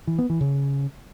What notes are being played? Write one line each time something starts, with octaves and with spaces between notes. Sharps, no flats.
E3
B3
E3
C#3